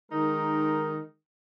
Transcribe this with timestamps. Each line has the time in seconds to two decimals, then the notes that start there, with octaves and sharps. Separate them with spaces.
0.12 D#3 G#3 D#4 A#4